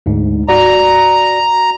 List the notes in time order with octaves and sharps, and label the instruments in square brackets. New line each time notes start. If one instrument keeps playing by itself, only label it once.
[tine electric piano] D2 G#2
[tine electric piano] F#4 D5 [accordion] A#5